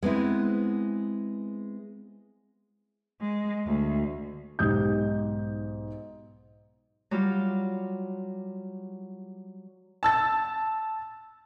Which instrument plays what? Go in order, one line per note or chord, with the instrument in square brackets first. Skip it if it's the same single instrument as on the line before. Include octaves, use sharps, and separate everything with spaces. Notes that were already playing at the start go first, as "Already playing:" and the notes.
[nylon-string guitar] G#3 B3 C4 E4
[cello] G#3
D2
[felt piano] B1 G#2 G4 D#6 G6
[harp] F#3 G3 F4
[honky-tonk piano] A5 E6 A6